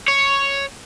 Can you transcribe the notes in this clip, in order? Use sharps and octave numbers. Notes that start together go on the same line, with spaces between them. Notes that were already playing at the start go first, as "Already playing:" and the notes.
C#5